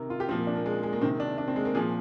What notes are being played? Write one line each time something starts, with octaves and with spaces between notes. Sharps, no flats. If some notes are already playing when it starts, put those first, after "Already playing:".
Already playing: C3 D#3 A#4
F4
G4
A#2 F3 C4
A#3
D4
A#3
G#3
G#3
A#3
C3 D#3 C4
D4
D4
C4
G#3
A#3
A#2 F3 G#4